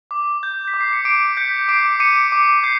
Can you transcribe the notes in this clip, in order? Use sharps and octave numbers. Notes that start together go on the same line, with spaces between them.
D6
G6
B6
D6
C7
C#7
D6 C7 D7
D7
G6 B6 C#7
D6 C7 D7
D6 C#7 D#7
D6
G6 C7